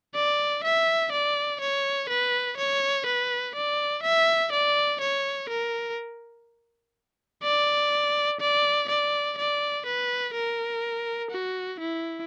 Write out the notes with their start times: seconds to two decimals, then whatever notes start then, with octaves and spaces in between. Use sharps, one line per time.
0.15 D5
0.64 E5
1.12 D5
1.61 C#5
2.09 B4
2.57 C#5
3.07 B4
3.55 D5
4.03 E5
4.52 D5
5.01 C#5
5.49 A#4
7.43 D5
8.41 D5
8.89 D5
9.38 D5
9.86 B4
10.35 A#4
11.31 F#4
11.80 E4